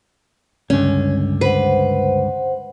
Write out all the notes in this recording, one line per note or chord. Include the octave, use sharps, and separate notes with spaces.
C#2 G2 D3 C#4
B4 C5 F#5